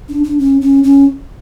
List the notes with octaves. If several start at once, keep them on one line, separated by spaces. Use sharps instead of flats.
D4
D4
C#4
C#4
C#4